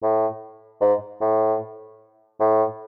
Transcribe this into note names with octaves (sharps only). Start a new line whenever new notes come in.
A2
G#2
A2
A2